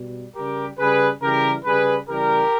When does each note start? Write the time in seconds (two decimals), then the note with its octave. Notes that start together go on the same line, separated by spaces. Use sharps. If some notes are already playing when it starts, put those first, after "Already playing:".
Already playing: B2 G3
0.35 C#3 G3 G4 A#4
0.78 C#3 G3 G#4 B4
1.22 C#3 E3 G3 G4 A#4
1.65 C#3 G3 G#4 B4
2.08 C#3 E3 G3 G4 A#4